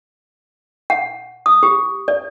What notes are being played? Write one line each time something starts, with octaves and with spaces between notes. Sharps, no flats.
F#5
D#6
G4
D5